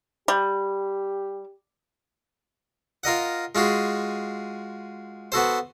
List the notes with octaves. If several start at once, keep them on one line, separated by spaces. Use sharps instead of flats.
G3 G4
F4 A#4 D#5 F#5
G#3 F4 F#4 G#4
B3 F#4 A4 C5